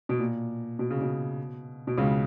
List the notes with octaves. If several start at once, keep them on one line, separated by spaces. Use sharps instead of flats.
B2
A#2
B2
C#3
B2
B2
C#2 C#3